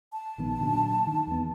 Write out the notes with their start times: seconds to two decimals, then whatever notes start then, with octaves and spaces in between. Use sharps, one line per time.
0.13 A5
0.38 A#1 D#3 B3
0.60 A#2 D3 F#3
1.07 D#3
1.27 E2 B3